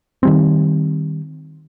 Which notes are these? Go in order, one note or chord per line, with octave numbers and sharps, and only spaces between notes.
D#3 G3 C4